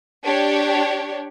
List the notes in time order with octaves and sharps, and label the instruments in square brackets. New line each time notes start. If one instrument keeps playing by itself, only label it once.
[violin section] D4 G4 C#5